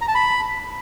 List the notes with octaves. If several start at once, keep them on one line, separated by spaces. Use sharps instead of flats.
A#5
A5
B5